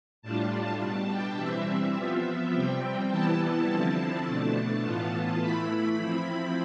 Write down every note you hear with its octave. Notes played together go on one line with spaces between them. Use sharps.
A2 G3 D4 F4 A5
B2 G3 D4 A5
G5
E3 G3 C4 E5
F3 B3 F4
C3 G3 C4 G5
E3 G3 B3 E4 A5
D3 F3 C4 E4
B2 A3 D4 A5
A2 E3 B3 F4
E3 A3 E4 B5
F3 C4 E4